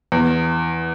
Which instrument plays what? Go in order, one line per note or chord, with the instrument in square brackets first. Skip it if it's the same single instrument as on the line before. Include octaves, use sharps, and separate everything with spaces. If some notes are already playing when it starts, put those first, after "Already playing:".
[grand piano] E2